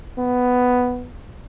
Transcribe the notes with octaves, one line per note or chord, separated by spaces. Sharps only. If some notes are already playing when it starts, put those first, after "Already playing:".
B3